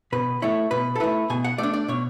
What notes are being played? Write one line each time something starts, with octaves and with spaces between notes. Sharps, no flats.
B2 B4
A3 E4 C#5
B2 B4
A4
A3 E4 B4
B2 G#5
F#5
A3 D4 D5
D5
B2 C#5